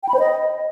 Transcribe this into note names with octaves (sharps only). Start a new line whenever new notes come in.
G5
B5
C5
D#5